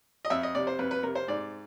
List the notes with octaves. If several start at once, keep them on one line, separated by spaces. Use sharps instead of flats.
D#5
F2 E5
D#5
C3 D5
C5
F2 B4
B4
C3 A#4
C5
G#2 D5